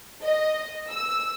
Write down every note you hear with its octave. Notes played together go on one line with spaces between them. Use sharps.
D#5
E6